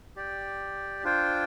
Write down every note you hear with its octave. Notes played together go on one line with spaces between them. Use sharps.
G4 D5 G5
D4 F4 C5 G5